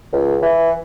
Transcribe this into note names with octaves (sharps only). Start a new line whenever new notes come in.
C#2
E3